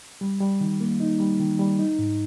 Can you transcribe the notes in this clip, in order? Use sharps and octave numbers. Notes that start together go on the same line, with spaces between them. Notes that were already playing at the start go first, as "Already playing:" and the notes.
G3
G3
D#3
A#3
D#4
G3
D#3
G3
D#4
G#2